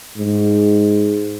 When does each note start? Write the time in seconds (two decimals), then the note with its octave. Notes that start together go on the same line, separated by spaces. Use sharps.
0.18 G#2